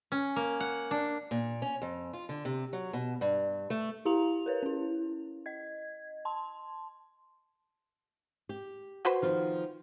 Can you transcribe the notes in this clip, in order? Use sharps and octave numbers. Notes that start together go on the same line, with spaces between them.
C#4
A#3
F#5
D4
A#2
C#4
F2
F4
D3
C3
F#3
B2
G2
A3
E4 G4 F5 A#5 F7
A#4 B4 C#5
C#4 E4
D#5 G#6
A5 C6
G4
F#4 B4 C5
D#3 F3 F4